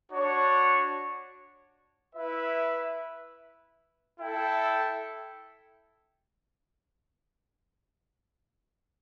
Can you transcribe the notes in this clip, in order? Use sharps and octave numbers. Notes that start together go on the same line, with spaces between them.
D4 F#4 C#5
E4 B4 E5
E4 A4 E5 G5